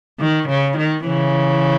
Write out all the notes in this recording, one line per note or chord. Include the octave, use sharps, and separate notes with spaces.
D#3
C#3
D#3
C#3 E3